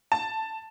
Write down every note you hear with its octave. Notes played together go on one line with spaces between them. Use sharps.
A5